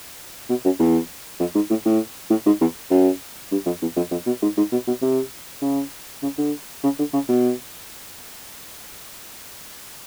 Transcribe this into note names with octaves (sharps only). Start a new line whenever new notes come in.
B2
F#2
E2
F2
G#2
A2
A2
A2
G#2
E2
F#2
G2
F2
E2
F2
F2
B2
G#2
G#2
B2
B2
C3
C#3
C#3
D3
C#3
D3
C#3
B2